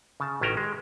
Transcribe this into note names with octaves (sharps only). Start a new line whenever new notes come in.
C#3 A5
A1 D#3 C#4 F#4 G5 A#5
G#3